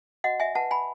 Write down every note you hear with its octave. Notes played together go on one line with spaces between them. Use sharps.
F#4 D#5 F#5
E5 G#5
B4 F#5 A5
G#5 B5